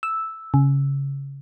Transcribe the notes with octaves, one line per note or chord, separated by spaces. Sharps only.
E6
C#3